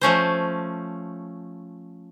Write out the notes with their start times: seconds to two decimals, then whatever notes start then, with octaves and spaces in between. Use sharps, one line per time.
0.01 F3 A3 C#4 C5